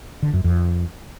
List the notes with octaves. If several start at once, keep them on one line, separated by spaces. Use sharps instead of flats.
D3
F#2
F2